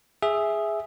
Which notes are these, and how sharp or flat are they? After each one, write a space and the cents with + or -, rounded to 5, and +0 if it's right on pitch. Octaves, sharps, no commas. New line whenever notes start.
G#4 +0 E5 +0